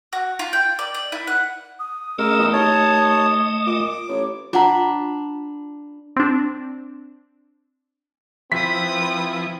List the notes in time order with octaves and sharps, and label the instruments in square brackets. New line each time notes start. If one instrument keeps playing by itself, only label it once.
[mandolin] F#4
F4
G5
D5
D5
E4
F#5
[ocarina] D#6
[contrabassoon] C#3 [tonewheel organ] A3 D#5 [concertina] A#4 E6
[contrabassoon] E2 [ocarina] D#6
[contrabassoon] D#2 [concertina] C#5 A5
[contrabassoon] A#2 [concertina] D6
[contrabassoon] A1 [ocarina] C#5
[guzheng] D4 B5 [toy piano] F4 F#5 A#5
[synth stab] C4 D4
[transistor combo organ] F3 E4 [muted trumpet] C4 [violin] B4 D#6 [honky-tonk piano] B6